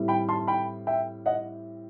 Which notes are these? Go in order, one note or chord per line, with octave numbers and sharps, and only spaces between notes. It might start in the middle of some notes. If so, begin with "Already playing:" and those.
Already playing: A2 G3 C4 E4
G5 B5
A5 C6
G5 B5
E5 G5
D#5 F#5